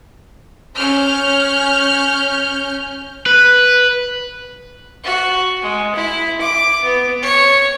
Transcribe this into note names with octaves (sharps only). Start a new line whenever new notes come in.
C#4 F6 G6
B4
F#4
G#3
E4
D6
B3
C#5